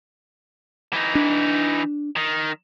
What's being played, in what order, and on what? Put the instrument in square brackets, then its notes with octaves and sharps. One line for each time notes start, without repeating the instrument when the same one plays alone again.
[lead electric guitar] E3 D#4
[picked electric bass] D4
[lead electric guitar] D#3